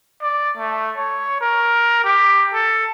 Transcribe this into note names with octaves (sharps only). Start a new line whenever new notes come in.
D5
A3
C#5
A#4
G4
A4